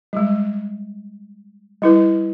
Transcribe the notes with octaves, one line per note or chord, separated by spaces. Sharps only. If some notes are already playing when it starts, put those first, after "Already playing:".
G3 G#3
G3 E4 B4